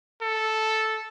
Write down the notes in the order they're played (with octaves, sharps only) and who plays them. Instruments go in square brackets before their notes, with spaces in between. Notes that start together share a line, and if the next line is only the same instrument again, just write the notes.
[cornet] A4